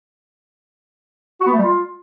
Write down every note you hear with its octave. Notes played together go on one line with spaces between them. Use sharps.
F#4
B3
A3
G3
F4